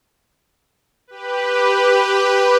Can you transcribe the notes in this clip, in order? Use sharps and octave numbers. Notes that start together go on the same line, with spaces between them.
G4 B4